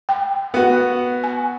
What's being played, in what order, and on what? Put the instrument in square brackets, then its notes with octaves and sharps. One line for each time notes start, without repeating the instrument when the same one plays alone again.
[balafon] G5
[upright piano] B3 F#4
[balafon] G#5